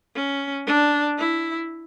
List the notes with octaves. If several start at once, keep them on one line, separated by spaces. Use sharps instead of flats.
C#4
D4
E4